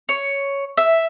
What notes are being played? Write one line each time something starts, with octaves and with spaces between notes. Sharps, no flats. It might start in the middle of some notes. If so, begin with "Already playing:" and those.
C#5
E5